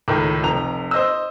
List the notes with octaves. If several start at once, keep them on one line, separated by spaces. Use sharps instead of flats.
C#2 A2 D#3
F1 F2 A#5 F7
C5 D#5 E6